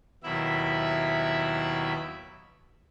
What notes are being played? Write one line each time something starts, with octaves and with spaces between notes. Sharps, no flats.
D#2 B2 F#3 E4 E5 B5